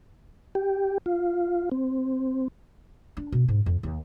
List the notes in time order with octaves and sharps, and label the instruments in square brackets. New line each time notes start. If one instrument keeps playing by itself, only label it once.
[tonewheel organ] G4
F4
C4
[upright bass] D4
B2
G#2
F2
D#2